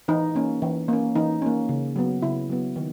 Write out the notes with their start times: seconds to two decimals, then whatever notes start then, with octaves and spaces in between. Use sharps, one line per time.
0.08 E3 D#4
0.35 A#3 C#4
0.62 E3
0.88 A#3 C#4
1.15 E3 D#4
1.42 A#3 C#4
1.69 C#3
1.96 F#3 B3
2.22 C#3 E4
2.50 F#3 B3
2.76 D#3